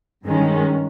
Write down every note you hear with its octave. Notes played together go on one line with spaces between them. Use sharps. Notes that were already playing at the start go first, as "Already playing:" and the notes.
G2 D#3 G#3 C#4